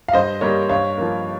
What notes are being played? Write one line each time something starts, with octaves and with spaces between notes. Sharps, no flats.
F5
G2 C5 D#5
G3 A#3 A#4 C#5
G2 C#5 F5
F3 A#3